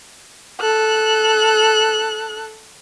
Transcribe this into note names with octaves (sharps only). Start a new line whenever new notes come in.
A4 F#6